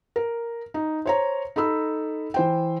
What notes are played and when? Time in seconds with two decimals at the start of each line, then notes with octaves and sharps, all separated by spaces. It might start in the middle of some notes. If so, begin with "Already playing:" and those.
0.16 A#4
0.74 D#4
1.06 C5 C#5 A#5
1.56 D#4 A4 B5 E6
2.34 E3 C5 G5